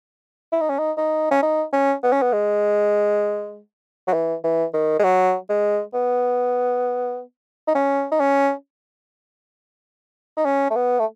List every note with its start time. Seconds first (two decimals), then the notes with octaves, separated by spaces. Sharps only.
0.52 E4
0.61 D#4
0.70 C#4
0.79 D#4
0.97 D#4
1.31 C#4
1.42 D#4
1.73 C#4
2.03 B3
2.12 C#4
2.22 B3
2.33 G#3
4.07 F#3
4.14 E3
4.44 E3
4.74 D#3
4.99 G#3
5.04 F#3
5.49 G#3
5.94 B3
7.67 D#4
7.75 C#4
8.11 D#4
8.20 C#4
10.37 D#4
10.45 C#4
10.70 A3
10.76 B3
10.99 A3